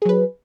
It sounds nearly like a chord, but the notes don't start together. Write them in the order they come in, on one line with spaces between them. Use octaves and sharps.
G#4 F#3 B4